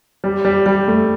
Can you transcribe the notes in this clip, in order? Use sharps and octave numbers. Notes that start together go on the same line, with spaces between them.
G3
G3
G3
A3